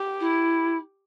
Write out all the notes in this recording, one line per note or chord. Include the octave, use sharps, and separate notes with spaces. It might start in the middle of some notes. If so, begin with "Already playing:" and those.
Already playing: G4
E4